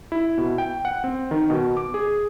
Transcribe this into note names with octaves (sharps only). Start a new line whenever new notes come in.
E4
B2
G5
F#5
C4
D#3
B2
D6
G#4